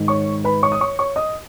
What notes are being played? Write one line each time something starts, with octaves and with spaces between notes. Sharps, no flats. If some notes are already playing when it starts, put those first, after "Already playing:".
Already playing: G#2 D#3
C#5 C#6
B4 B5
C#5 C#6
D#6
C#5 C#6
C#5 C#6
D#5 D#6